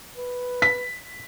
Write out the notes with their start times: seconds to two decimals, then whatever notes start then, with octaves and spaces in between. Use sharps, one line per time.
0.18 B4
0.62 B6